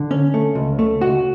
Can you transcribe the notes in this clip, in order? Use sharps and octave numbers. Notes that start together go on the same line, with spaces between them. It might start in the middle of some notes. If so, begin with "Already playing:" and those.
Already playing: D3
C#4
A3
C#2
A3
C#2 F#4